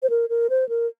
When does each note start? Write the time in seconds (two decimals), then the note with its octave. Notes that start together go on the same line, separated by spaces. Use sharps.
0.03 C5
0.10 A#4
0.30 A#4
0.50 C5
0.69 A#4